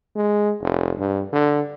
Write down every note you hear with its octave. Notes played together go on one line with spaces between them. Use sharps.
G#3
F1
G2
D3